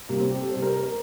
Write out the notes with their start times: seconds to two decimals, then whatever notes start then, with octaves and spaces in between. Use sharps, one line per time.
0.09 C3 G3 A#3
0.20 C4
0.30 G4
0.40 A4
0.51 G3 C5
0.56 C3
0.62 A#4
0.72 A#4
0.83 A#4